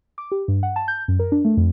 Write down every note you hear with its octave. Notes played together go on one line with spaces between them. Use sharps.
D6
G4
G2
F#5
A5
G6
F#2
A#4
D4
A3
F2